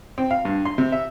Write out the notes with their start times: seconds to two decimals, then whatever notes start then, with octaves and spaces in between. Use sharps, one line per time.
0.18 C4
0.31 F5
0.45 G2
0.65 C6
0.78 C3
0.92 E5